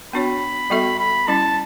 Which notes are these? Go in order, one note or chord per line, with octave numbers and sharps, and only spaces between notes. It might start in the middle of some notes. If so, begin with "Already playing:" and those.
B3 D4 F#4 C#5 B5
G3 B3 F#4 A4 E5
B5
G3 C#4 E4 A5